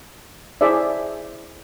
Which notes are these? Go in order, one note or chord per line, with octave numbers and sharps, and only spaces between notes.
E4 G#4 C5 D5 E5